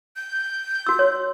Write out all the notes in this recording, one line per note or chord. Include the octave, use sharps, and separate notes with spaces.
G6
F#4 E6
C#5